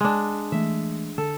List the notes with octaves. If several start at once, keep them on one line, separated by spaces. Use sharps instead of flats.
G#3 D4
E3 G#3 A3 E5
D3 A4